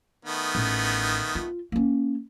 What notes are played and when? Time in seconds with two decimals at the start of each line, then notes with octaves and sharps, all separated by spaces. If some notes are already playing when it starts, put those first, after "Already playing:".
0.25 D#3 A3 B3
0.55 A1
1.35 F4
1.72 A#3 C#4